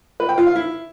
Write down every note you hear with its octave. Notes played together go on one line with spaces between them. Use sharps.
B4
G5
F4
F5
E4